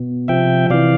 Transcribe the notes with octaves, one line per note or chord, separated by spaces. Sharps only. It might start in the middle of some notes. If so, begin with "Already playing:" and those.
Already playing: B2
C3 F3 E5 G5
C3 E3 D5 F5